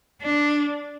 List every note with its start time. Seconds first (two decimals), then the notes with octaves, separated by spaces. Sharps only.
0.21 D4